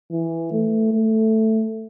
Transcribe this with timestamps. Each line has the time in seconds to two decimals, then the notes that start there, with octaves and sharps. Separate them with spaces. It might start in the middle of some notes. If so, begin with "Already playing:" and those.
0.12 E3
0.52 A3
0.92 A3